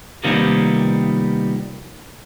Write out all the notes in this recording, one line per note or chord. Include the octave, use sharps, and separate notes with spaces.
C3 D#3 F3 G3 A#3 B3